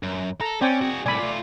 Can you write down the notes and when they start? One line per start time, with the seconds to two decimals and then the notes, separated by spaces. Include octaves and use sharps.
0.03 F#2
0.41 A4 A#5
0.61 C4 C#4 D5 G5 G#5
0.81 F#4 G#4
1.06 C2 A2 D5 G#5 B5
1.19 A3 F4